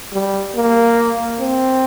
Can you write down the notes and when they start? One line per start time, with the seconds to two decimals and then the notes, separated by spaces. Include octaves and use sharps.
0.13 G3
0.56 A#3
1.41 C4